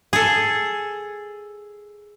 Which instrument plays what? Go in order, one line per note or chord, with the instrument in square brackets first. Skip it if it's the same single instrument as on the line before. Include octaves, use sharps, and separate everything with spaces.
[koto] G#4 A4